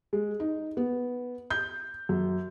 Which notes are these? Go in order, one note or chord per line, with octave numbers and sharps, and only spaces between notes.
G#3
D#4
B3
G6
F#2